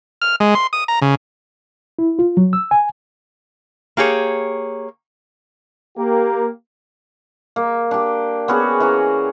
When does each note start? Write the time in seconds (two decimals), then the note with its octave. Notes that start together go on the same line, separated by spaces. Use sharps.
0.22 F6
0.40 G#3
0.55 C6
0.73 D#6
0.88 A#5
1.02 C#3
1.99 E4
2.19 F4
2.37 F#3
2.53 E6
2.71 G#5
3.97 A#3 G4 G#4 C#5
5.97 A#3 G4
7.56 A#3
7.91 D4 G4
8.48 B3 C#4 F#4 G#4
8.80 E3 C#4 A#5